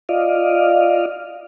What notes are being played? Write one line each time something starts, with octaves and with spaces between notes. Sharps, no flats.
F4 D5 D#5 F5